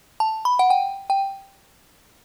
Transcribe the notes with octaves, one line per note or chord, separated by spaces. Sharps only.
A5
B5
F#5
G5
G5